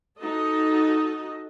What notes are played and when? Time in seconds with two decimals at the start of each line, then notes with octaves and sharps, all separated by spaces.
0.20 D#4 F#4 A4 D#5